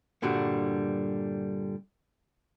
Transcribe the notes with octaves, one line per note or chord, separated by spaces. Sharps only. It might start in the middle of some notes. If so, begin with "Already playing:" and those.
G2 A#2 D3 G3 F#4